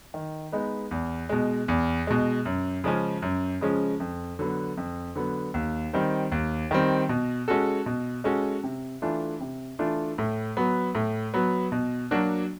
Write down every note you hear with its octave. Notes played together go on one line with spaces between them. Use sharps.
D#3
G#3 B3 D#4
E2
B2 G#3
E2
B2 G#3
F#2
C#3 F3 G#3 C#4
F#2
C#3 F3 G#3 C#4
F2
D3 F#3 B3
F2
D3 F#3 B3
D#2
D#3 G3 C4
D#2
D#3 G3 C4
B2
G#3 C#4 F#4 A4
B2
G#3 C#4 F#4 A4
C3
E3 A3 D4 F4
C3
E3 A3 D4 F4
A2
F#3 B3
A2
F#3 B3
B2
F#3 A#3 D4 F#4